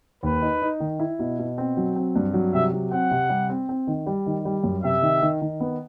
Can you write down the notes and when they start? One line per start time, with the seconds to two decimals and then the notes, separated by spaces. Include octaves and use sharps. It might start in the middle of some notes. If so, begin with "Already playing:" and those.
0.23 D#2 B4
0.42 D#4
0.62 D#4
0.80 D#3
1.00 E4
1.19 B2
1.39 B2
1.58 C4
1.77 F#3
1.96 C4
2.16 G2
2.34 F#3
2.54 C3 E5
2.73 F#3
2.91 C4 F#5
3.11 C3
3.29 G3
3.49 C4
3.69 C4
3.87 D#3
4.06 G3
4.26 D#3
4.45 G3
4.64 F#2
4.84 C3 E5
5.02 D#3
5.22 D#3
5.41 D#3
5.60 B3